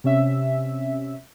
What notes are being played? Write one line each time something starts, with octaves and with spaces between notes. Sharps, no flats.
C3 C#4 E5